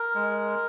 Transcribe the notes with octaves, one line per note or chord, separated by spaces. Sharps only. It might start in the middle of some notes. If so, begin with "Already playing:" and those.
Already playing: A#4
G#3